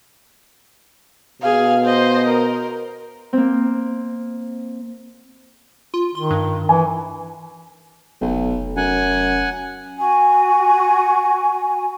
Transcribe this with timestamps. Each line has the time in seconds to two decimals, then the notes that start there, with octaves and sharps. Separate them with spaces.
1.42 B2 G#4 F5
1.85 C5 D#5
2.29 A#4
3.33 A#3 C4
5.94 F4
6.15 D#3 C6
6.31 G2
6.69 E3 G#5
8.21 F1 B1
8.77 F#2 F#5 G#5
9.97 F#4 G#5